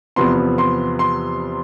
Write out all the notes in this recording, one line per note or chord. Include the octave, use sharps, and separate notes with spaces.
E2 C3 F3 B3 C6
C6
C6